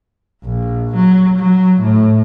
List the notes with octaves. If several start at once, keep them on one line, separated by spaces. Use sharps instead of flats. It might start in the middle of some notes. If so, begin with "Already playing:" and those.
A#1
F#3
F#3
A2